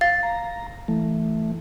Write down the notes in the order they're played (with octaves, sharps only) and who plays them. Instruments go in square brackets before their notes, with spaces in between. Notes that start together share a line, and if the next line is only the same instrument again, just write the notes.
[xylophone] F5 A6
[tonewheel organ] A#5
E3 A3